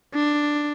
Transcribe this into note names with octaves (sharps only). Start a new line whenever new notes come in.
D4